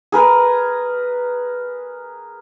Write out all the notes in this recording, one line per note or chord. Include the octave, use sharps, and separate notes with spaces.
G#4 A#4 B4